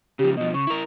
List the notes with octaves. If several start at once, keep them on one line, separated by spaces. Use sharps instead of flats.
C#3 F3 G4
B2 F3 D#5
C#3 C#6
E4 A#4